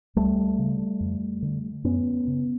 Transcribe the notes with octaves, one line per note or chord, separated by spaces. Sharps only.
C#2 G3 A3
C#3
F2
D3
F#2 B3 C#4
C#3